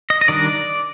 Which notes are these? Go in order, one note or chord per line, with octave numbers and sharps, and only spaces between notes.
D#5
D#5
D#3 G3 D4 D5